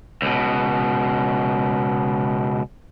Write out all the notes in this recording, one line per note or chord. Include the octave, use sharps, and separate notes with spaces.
C#2 B2